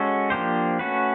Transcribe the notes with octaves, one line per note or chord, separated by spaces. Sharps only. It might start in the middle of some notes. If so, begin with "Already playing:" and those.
Already playing: G#3 C#4 F#4 A4
F3 A#3 D4 G4 C5
A3 C#4 F#4 B4